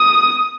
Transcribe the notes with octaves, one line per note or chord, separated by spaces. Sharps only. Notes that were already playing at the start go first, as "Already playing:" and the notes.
Already playing: D#6